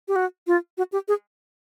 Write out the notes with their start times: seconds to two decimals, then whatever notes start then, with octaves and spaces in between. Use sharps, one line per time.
0.08 G4
0.16 F#4
0.47 F4
0.78 F#4
0.92 G4
1.08 G#4